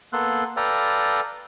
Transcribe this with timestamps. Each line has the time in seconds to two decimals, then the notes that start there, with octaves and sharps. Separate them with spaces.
0.13 A#3 B3 A4 C6 F#6
0.57 A4 B4 D5 F5 G5 A#5